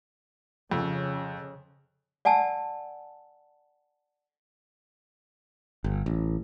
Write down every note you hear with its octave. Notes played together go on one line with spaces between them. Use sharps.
F2 C#3
D5 F#5 G#5 A5 E6
G1
A1